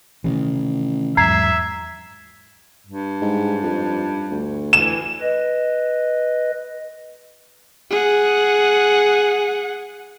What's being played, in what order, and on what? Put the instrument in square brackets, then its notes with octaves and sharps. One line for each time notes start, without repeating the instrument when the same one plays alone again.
[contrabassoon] A1 [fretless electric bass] C3 D#3 E3
[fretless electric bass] E2 G#2 F#3 [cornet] E5 [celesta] A#5 G#6 C7
[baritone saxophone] G2
[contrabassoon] G#2
F2
D2
[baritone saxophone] E3 [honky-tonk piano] E7
[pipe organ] B4 D#5
[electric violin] G#4 F#5